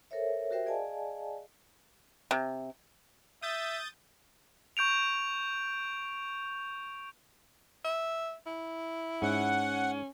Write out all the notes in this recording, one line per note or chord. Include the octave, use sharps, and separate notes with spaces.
A4 A#4 C5 C#5 E5
F#4 G4 A#4 C5 E5 G5
G#4 D5 D#5 F5 G#5 A5
C3
E5 D#6 G6 A6
C#6 G6 D7 F7
E5
E4
G#2 C#4 F#5